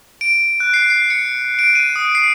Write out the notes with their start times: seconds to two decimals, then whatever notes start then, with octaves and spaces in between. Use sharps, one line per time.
0.21 D7
0.60 F#6
0.74 C7
0.90 C7
1.10 C#7
1.59 D7
1.75 D#7
1.96 D#6
2.15 C7